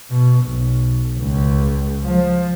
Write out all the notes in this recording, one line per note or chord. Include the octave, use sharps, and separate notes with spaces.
B2
B1
C#2
F3